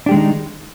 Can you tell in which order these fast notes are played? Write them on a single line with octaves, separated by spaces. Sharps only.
D4 G4 G#3 D#3 D#4